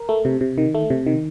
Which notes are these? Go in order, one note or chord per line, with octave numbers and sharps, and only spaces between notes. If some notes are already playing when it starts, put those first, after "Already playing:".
Already playing: A#4
A3
C3
C3
D#3
A3
C3
D#3